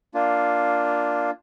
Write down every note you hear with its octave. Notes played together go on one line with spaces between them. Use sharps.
A#3 D4 F4